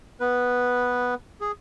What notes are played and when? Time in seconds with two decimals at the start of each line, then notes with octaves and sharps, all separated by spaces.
0.20 B3 B4
1.41 G#4